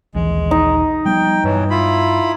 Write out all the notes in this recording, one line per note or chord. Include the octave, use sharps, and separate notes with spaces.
A#1 D#2 E3 G#3
D#4
F3 G3 B3 G5
G2 B2 E3 F#3
E4 F4 B5